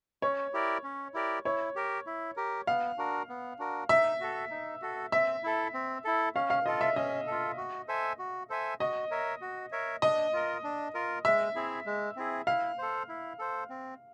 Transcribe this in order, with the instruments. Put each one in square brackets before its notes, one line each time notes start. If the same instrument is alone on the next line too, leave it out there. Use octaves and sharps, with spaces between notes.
[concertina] C#4 [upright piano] C#5
[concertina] E4 G4 A#4 D5
C#4
E4 G4 A#4 D5
[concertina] E4 [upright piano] C#5
[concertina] G4 A#4
E4
G4 A#4
[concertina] B3 [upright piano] F5
[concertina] D4 F#4 A#4
B3
D4 F#4 A#4
[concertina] D#4 [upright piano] E5
[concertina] F#4 A4
D#4
F#4 A4
[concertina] C4 [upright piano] E5
[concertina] E4 A4
C4
E4 A4
[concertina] C#4 [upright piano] F5
[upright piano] F5
[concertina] F4 A4 [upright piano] D#5
[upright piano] E5
[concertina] C#4 [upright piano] D#5
[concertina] F4 A4
F#4
A4 C5 E5 G#5
F#4
A4 C5 E5 G#5
[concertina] F#4 [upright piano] D#5
[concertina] A#4 C#5 E5
F#4
A#4 C#5 E5
[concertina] D4 [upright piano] D#5
[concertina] F4 A#4
D4
F4 A#4
[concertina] G#3 [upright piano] E5
[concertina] C4 E4 G#4
G#3
C4 E4 G#4
[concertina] E4 [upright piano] F5
[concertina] A4 C5
E4
A4 C5
C4